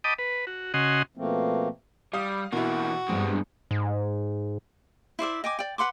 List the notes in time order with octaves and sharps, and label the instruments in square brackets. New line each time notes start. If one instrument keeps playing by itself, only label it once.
[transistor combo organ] D#5 G5 A5 B5 D6 D#6
B4
F#4
C#3 F#4 D#5 F#5 G#5 C6
[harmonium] B2 F3 A3 A#3 C4
[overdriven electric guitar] G3 [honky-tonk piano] F5 D#6
[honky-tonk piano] B2 E4 [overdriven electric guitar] E3 A#3 [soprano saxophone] F#4
[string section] G2 [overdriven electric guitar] B2 G#3 [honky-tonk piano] C4
[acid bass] G#2
[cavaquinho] E4 C5 D5 E5
D#5 G5 G#5 D6
D5 G5
B4 F#5 C6 D6